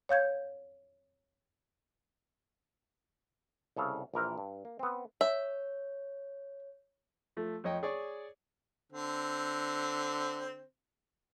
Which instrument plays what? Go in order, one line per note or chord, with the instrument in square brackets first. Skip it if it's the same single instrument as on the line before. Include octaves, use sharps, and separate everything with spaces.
[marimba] C#5 F5 G6 G#6
[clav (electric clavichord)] C2 C#3 A4 F5
A#1 E3 A#4 C5
G2
A#3
B3 C4
[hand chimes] C#5 [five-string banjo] E5
[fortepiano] F3 A3
F2 C#5 D#5 G5
G#4 C#5 D5 C#6
[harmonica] D3 C4